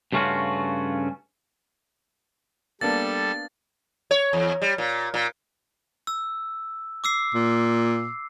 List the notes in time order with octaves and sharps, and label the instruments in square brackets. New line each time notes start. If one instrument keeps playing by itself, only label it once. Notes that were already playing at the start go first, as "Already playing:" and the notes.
[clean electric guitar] G2 C#3 A3 C#4 F4 F#4
[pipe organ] G3 A4 [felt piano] A#3 B3 D4 [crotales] A6
[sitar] C#5
E2
G3
A#2
A#2
[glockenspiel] E6
D6 E6 C7
[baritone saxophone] A#2